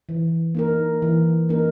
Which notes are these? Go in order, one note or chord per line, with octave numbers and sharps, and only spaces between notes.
E3
A#3 D#4 A#4
E3
A#3 D#4 A#4